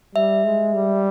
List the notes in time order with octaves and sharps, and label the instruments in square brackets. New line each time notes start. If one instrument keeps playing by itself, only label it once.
[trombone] G3 [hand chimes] E5
[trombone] G#3
G3